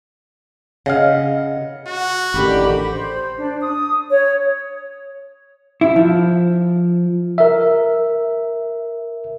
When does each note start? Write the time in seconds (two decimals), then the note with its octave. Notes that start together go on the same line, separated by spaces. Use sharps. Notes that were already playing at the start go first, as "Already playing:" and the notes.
0.86 C#3 D#5 F5 F#5
1.87 F#4
2.34 A1 D3 D#3 G4 B5
2.90 C5
3.38 D4
3.60 D#6
4.09 C#5
5.81 E4
5.96 F3
7.38 A#4 E5